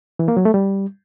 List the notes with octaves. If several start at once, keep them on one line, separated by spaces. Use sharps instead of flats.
E3
A#3
F#3
A3
G3